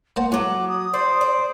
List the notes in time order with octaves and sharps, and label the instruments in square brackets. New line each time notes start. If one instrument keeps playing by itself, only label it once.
[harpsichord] A#3 C5 A5 [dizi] F#5
[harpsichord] A2 [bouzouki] F#3 F#5 [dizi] D6
[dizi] D#6
[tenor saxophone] C5 [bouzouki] D5
[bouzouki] D5